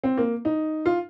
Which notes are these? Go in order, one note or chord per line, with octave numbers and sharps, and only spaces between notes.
C4
A#3
D#4
F4